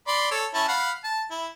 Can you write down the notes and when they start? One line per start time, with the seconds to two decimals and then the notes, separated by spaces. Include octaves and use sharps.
0.07 D5 B5 C6
0.31 A4 C#5
0.54 C#4 E4 A5
0.68 F5 F#5 B5
1.04 A5
1.31 E4